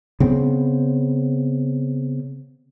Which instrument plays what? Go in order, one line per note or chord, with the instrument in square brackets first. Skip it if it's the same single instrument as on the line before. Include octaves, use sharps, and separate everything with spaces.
[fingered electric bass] C#3 B3 C4